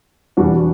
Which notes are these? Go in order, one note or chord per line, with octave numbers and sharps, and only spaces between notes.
E2 B2 G3 D4 F#4